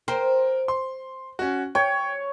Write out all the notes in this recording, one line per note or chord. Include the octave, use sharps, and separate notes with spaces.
A#4 C5 G5
C6
C#4 F#4
C#5 G5